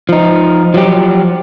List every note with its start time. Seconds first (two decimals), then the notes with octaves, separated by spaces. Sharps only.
0.09 F3 D#4
0.74 F3 F#3 G4